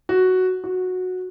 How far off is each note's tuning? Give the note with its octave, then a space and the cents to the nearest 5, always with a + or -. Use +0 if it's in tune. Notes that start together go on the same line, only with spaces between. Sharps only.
F#4 +5
F#4 -10